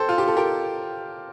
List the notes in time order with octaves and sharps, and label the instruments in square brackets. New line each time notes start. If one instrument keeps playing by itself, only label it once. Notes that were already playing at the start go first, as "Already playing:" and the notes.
Already playing: [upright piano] G4 A4 C5
F4
G4
A4
G4 A#4